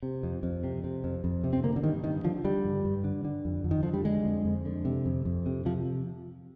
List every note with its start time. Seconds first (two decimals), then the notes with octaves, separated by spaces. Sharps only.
0.03 C3
0.23 F2
0.43 F2
0.64 C3
0.84 C3
1.04 F2
1.24 F2
1.44 C3
1.53 C4
1.63 D3 A#3
1.76 D3
1.83 G2 D#3
2.04 G2 D#3
2.24 D3 F3
2.44 D3 G3
2.65 G2
2.85 G2
3.04 D3
3.25 D3
3.45 F2
3.64 F2
3.71 D#3
3.83 D3 F3
3.94 G3
4.05 D3 G#3
4.25 F2
4.44 F2
4.65 D3
4.85 C3
5.06 F2
5.25 F2
5.46 C3
5.65 C3 F3